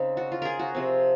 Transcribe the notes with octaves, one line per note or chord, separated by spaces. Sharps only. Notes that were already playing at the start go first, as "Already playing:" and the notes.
Already playing: C#3 C4 D#4
F#4
F4
G#4 A#4
F#4
C3 F3 C4